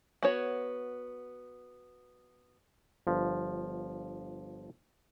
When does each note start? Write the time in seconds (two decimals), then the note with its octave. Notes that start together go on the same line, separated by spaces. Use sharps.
0.23 B3 F#4 C#5
3.07 G1 F3